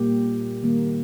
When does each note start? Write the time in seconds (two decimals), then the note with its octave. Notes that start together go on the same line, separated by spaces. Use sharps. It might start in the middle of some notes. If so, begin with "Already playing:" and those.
Already playing: A#2 G3 A#3 G4
0.63 D#3 G3 A#3